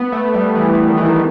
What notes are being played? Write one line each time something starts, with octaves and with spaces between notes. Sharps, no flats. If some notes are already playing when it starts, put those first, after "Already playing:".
Already playing: B3
A3
G3
E3
D#3
E3
D#3